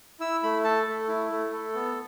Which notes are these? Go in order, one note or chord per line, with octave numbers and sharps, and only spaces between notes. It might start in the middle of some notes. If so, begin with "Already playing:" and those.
E4 E6
A3 B5
A4 A5
A3
E4
A3
A4
B3